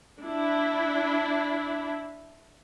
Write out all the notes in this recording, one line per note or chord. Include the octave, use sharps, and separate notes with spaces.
D4 E4